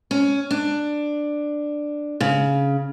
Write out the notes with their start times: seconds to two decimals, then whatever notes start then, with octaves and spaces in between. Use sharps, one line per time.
0.11 C#4
0.51 D4
2.21 C#3